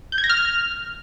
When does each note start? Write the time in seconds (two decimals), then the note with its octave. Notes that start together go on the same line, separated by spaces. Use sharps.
0.12 G6
0.18 G#6
0.24 A#6
0.30 F6